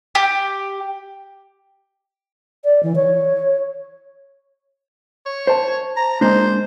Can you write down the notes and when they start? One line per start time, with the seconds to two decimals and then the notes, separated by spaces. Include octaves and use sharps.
0.15 G4
2.64 D5
2.83 E3
2.96 C#5
5.26 C#5
5.47 C5 A5
5.97 A#5
6.21 G#3 A#3 D4 C5